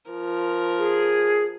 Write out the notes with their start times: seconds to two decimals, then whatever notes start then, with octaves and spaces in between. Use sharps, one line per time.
0.11 F3 A#4
0.78 G#4